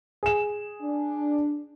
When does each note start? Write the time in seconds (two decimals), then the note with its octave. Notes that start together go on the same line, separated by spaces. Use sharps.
0.23 G#4 E7
0.81 D4